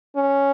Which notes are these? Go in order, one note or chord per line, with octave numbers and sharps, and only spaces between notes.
C#4